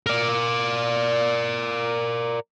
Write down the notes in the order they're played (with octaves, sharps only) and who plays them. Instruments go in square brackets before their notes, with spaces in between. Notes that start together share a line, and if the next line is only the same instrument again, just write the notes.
[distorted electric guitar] A#4 D5